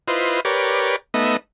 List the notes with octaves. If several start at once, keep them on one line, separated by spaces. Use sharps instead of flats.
E4 F4 B4 C5 D#5
G4 A#4 B4 C#5 D5
A3 B3 D#4 D#5 E5